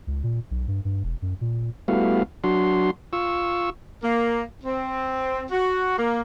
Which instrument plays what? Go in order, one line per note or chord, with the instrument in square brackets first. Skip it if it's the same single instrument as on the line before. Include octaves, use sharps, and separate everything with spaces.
[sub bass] C#2
A#2
B1
G2
G2
E1
F#2
A#2
[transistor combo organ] G3 A3 B3 E4 F#4 F5
F#3 D4 F#4 C6
F4 C#6 E6
[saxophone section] A#3
C4
F#4
A#3